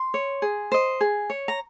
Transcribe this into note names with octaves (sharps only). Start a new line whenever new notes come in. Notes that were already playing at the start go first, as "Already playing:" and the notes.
Already playing: C6
C#5
G#4
C5 D#5
G#4
C#5
A#5